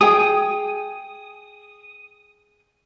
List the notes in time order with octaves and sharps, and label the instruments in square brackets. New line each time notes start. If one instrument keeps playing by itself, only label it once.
[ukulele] G#4 G5 [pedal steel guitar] D#6